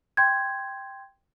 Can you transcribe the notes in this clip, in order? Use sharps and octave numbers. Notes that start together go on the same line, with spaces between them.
G5 C6 G6 G#6